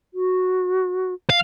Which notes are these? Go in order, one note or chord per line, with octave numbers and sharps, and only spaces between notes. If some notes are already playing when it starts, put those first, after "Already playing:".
F#4
F5